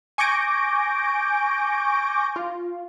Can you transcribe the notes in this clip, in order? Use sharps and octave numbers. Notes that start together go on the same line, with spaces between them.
G#5 C#6 D6 G6 A#6 D7
F4